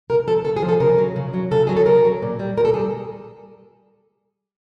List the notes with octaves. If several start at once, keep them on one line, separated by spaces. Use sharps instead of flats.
C#3 A#4
F3 A4
C#3 A4
G#4
F3
A4
C#3 A#4
F#3
C#3
F#3
C#3 A4
F#3 G#4
A4
C#3 A#4
F#3
A#2
G3
A#2 A#4
A4
G3 G#4